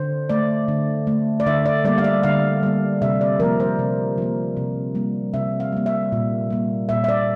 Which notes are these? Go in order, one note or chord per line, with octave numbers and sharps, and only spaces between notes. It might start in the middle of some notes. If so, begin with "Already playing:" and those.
Already playing: D3 C5
A3 D5
D3
A3
D5
D3 E5
D5
G3 A#3 D5
F5
E5
D3 F5
G3 A#3
C3 E5
D5
F3 A#3 A#4
C5
C3
F3 A#3
C3
G3 A#3
C3 E5
F5
G3 A#3
E5
A#2
G3 A#3
A#2 E5
E5
D5